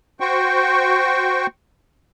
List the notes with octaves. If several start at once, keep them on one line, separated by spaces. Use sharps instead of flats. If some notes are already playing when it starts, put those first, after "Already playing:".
F#4 C5 G5 C#6